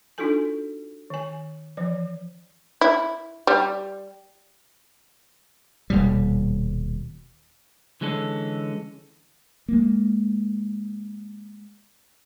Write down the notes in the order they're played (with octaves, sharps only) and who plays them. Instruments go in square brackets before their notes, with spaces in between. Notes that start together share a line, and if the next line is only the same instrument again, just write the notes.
[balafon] D4 D#4 F4 F#4 A4 G#5
D#3 G#5
E3 F3 C5
[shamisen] E4
G3
[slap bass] D#1 B2 G3
[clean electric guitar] D3 E3 G#3 C#4 A4
[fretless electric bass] G#3 A#3